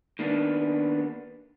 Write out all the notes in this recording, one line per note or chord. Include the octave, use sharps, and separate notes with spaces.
D#3 A#3 B3 D4